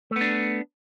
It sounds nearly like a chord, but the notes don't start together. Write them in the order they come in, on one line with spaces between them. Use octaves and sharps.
A3 B3 D4